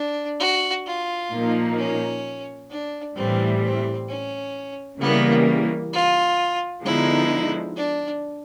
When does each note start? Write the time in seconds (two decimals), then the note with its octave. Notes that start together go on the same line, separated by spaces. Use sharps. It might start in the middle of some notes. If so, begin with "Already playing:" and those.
Already playing: D4
0.40 F#4
0.86 F4
1.32 A#2 F3 A#3 D#4
1.78 C#4
2.70 D4
3.16 A2 E3 G3 C4
3.63 C4
4.09 C#4
5.01 C#3 E3 G3 A#3 B3
5.93 F4
6.84 D3 F3 G#3 B3 D#4 E4
7.76 D4